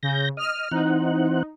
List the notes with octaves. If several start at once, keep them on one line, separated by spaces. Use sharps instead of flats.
C#3 G6 A#6
D#5 F6
E3 C4 D#4 F#5